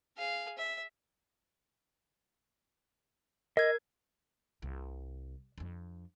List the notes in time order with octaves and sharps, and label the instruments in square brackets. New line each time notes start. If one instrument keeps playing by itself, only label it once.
[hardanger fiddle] G#4 F5
E5
[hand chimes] A#4 G#6 [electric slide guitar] D#5
[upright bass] C2
F2 D4